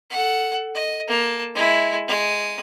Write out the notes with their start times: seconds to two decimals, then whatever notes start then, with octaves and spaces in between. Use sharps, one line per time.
0.10 A4 F#5
0.75 D#5
1.08 A#3 A5
1.55 G#3 E4
2.08 G#3 D#6